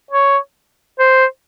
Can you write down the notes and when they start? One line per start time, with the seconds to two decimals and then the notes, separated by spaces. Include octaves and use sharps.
0.11 C#5
0.99 C5